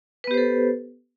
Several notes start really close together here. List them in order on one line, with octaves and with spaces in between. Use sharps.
B4 B3 G4 C5 A4